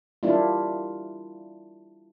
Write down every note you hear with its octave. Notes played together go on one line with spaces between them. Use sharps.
G3 A#3 D4 E4 F4